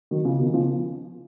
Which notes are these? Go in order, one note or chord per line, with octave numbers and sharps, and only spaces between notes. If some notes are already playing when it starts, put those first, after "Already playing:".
D#3 F#3
C#3 F3
B2 D#3
C#3 F3